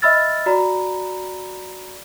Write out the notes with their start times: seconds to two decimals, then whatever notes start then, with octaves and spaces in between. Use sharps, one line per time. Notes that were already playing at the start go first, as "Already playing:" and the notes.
0.02 D#5 E5 B5 E6 F6 A6
0.46 F#4 D5 A#5 B5